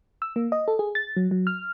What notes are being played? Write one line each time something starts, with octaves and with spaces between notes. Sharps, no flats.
E6
A#3
D#5
A4
G#4
A6
F#3
F#3
F6